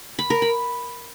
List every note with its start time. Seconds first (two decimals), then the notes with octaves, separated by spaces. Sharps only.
0.19 B5
0.30 A#4
0.42 B5